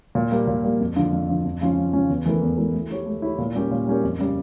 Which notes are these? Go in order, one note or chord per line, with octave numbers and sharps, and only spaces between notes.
A#2
G3 A#3
A#2
G3 A#3
F2
D3 F3
F2
D3 F3
F2
C#3 F3 C#4 F4
F2
C#3 F3 C#4 F4
E2
E3 A3 E4 A#4
E2
E3 A3 E4 A#4
A3
E4 G4 C#5
A3
E4 G4 C#5
A#2
G3 C#4 G4 A#4
A#2
G3 C#4 G4 A#4
F2
C#3 G3